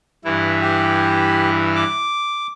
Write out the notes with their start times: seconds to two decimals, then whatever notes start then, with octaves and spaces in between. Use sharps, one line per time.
0.24 G2 E3 E4
0.62 G4
1.75 D6